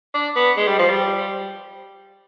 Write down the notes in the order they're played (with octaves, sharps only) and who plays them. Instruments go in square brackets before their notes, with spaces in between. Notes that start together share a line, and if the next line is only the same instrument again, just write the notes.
[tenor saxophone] D4
B3
G#3
G3
F3
G3